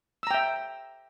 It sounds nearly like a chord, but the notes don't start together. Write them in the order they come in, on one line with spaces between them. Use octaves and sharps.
E6 A#5 G5 E5